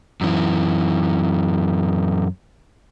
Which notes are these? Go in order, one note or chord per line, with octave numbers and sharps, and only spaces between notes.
F#2 E3